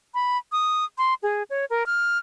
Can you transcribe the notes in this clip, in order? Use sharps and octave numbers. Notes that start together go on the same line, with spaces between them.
B5
D#6
C6
G#4
C#5
A#4
F6